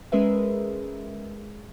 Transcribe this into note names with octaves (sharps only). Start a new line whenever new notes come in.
G#3 C#4 G#4 A#4 B4 E5